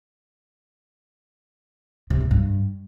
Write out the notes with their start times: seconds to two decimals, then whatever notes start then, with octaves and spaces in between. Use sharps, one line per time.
2.10 C3
2.21 G#2
2.31 G2